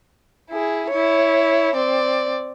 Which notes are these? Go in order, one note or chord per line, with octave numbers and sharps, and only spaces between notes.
E4 G#4
E4 C#5
C4 D5